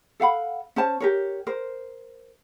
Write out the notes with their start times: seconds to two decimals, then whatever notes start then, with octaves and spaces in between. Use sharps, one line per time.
0.20 A4 F5 F#5 B5
0.76 C#4 C5 A5
1.00 G4 A#4 C#5
1.47 A#4 C5